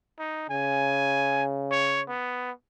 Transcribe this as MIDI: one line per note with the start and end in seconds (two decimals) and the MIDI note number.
0.19 0.44 63
0.50 2.15 49
0.50 1.44 80
1.71 2.02 73
2.08 2.51 59